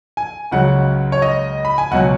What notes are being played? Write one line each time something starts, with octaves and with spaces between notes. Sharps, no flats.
G#5
C#2 C#3 F#3 F#5
C#5
D#5
B5
G#5
C#2 B2 F#3 F#5